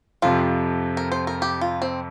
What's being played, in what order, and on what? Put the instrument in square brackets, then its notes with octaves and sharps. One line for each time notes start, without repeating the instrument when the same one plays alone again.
[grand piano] F2 C3 F3 [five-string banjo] F4
[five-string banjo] A#4
C5
A#4
G4
F4
C4